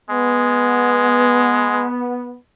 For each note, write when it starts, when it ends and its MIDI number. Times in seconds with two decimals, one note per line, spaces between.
0.10 1.87 56
0.10 2.37 59